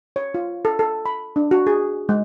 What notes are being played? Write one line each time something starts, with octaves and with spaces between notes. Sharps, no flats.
C#5
F4
A4
A4
B5
D4
F#4
G#4
G#3